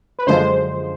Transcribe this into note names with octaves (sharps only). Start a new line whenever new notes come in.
B4
F#2 D3 F3 G#3 C5